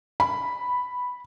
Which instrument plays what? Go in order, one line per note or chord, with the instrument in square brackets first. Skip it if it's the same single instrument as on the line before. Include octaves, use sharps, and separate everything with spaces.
[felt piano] B5